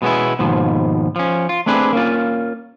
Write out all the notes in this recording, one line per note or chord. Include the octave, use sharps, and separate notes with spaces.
B2 G#3 B3 C#4 E4
D#2 G#2 B2 F3
F3 C#4
F4
A3 C4 D4 G#4 B4
A#3 C#4 F4